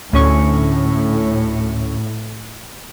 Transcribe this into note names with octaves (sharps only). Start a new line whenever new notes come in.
D2 A2 C#4 C#6